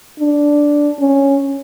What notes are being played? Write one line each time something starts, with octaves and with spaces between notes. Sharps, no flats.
D4
C#4